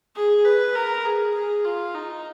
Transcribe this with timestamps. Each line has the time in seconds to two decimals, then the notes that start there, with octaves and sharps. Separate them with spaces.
0.16 G#4
0.45 B4
0.75 A#4
1.05 G#4
1.34 G#4
1.65 F4
1.95 D#4